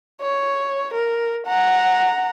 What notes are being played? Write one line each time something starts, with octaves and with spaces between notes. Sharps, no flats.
C#5
A#4
F#5 A#5